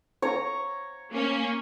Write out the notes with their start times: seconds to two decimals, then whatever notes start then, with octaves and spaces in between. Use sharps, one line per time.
0.22 C#5 A#5
1.11 A#3 C#4